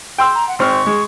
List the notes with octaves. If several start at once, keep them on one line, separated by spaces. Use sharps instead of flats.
G5 C6 E6
A#5
F#5
G#1 C4 C#6 F6
G#3